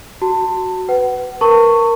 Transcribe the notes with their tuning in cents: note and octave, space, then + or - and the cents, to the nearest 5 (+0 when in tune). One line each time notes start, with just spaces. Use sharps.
F#4 +0 A5 +25
B4 +15 F#5 +30
A#4 +0 A5 +40 C#6 +0